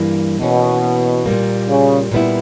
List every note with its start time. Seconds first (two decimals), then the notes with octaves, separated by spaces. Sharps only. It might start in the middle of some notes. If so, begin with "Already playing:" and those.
Already playing: G2 E3 G3 A#3
0.40 B2 E3 A#3 C#4
1.26 A#2 G3 A#3
1.69 C#3
2.12 A#2 G3 B3 E4